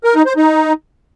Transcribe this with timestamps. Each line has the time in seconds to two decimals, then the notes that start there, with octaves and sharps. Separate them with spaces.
0.04 A#4
0.15 D#4
0.26 C5
0.37 D#4